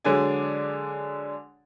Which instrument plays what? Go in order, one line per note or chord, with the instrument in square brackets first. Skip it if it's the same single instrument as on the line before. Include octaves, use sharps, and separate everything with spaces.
[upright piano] D3 F#3 G#3 D4 D5 G#5